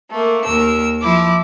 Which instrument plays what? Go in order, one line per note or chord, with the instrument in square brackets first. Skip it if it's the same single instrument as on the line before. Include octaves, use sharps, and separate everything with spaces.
[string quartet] A3 A#3
D#2 A#4 E6
F3 E4 D6